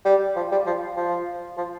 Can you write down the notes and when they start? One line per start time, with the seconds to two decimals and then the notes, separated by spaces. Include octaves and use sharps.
0.05 G3
0.36 F3
0.52 G3
0.66 F3
0.97 F3
1.57 F3